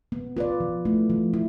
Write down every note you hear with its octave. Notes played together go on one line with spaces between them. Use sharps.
B3
F4 B4 D5
F3
A3 E4
F3
E4